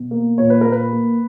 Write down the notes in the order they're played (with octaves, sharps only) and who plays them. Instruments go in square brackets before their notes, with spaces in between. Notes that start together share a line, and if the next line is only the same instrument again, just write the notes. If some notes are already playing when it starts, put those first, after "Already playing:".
Already playing: [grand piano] B2
A#3
A#2 C#5
B4
A#3 A#4
B4
A#3